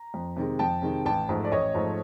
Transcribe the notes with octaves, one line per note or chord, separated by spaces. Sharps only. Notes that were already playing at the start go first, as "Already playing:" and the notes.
Already playing: A#5
F2
C3 D#3 G#3
F2 G5 A5
C3 D#3 G#3
A1 G5 A5
G#2 F3 A3
D5
A1 C#5 D#5
G#2 F3 A3